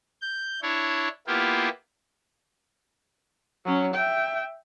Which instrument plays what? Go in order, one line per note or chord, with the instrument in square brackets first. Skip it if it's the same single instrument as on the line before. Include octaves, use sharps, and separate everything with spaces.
[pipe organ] G6
D4 E4 C#5
A#3 B3 E4 F4 G4
[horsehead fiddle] F#3 C#4
E5 G5